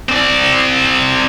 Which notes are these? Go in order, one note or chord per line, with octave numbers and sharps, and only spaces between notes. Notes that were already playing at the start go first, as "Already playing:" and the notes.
C4 D5